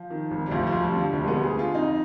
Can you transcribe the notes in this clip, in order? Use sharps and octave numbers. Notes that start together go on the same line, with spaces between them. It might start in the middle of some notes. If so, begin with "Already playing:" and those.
Already playing: F3
D#3
G#1
G3
D2 F3
F3
D2
G3
D3 F3
D2 G3
G#3
B3
D2
G#4
D3
F4
F2 D#4